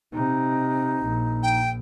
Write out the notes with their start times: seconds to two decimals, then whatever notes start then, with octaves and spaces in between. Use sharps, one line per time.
0.13 C3 D#4
1.03 A#1
1.43 G5